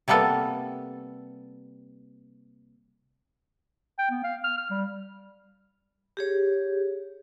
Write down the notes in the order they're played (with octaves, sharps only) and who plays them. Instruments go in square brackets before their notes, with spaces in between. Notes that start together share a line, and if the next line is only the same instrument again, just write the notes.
[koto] C3 G3 A#3 B3 A4
[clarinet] G5
B3
F5
F6
F6
G3
[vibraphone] G4 G#4 C#5